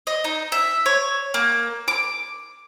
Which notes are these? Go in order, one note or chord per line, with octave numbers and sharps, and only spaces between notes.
D#5
D#4
E5
C#5
A#3
D6